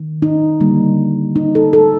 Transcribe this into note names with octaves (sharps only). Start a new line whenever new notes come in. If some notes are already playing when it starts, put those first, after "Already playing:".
Already playing: D#3
D#4
D3 G3 A#3
D#4
A4
A4